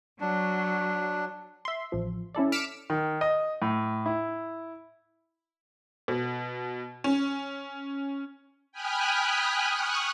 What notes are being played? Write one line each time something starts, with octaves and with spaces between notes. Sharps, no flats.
F#3 D4
E5 C6
A1 F3
C#4 E4 A4 D5
D6 F6 B6 C#7 D7 E7
D#3
D#5
A2
E4
B2
C#4
G5 G#5 B5 D#6 F6 F#6
C#6 D#6 F6 F#6